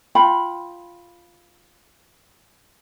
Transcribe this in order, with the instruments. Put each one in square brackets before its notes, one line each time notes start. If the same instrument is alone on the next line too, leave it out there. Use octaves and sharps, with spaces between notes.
[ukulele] F4 G5 B5